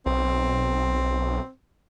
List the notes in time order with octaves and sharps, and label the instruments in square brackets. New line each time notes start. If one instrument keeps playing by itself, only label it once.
[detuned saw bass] B1 [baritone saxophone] C4